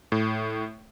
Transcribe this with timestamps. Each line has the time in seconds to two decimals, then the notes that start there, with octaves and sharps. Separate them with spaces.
0.12 A2